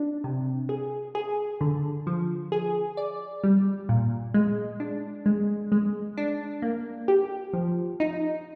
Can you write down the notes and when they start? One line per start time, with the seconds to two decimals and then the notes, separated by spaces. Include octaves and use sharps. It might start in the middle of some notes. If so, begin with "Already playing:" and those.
Already playing: D4
0.24 C3
0.69 G#4
1.15 G#4
1.61 D3
2.07 F3
2.52 G#4
2.97 D5
3.44 G3
3.89 A#2
4.34 G#3
4.80 D4
5.26 G#3
5.72 G#3
6.17 D4
6.62 A#3
7.08 G4
7.53 F3
8.00 D#4